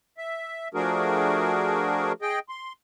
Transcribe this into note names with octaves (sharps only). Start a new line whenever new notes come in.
E5
F3 A3 D4 F#4 G#4 A#4
G#4 D#5 G5
C6